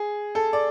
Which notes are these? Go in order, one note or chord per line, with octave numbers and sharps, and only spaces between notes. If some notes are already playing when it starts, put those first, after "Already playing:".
Already playing: G#4
A4
D5